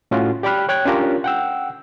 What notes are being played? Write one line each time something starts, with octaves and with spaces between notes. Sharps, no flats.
A2 C#4 F4 F#4
G4 D5 G5 B5 F6 F#6
C#5 G5 F#6 G#6
C#4 D4 F4 G4 A#4 C#5
F#5 G5 E6